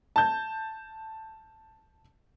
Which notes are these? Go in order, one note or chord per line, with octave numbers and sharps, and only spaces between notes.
A5 G6